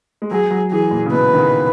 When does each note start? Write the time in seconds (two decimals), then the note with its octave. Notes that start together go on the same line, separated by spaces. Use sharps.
0.22 G#3
0.31 F#3 G#4
0.51 F#3
0.71 E3 G#4
0.91 A#2
1.06 C#3
1.12 B2 B4
1.33 D#3
1.38 C#3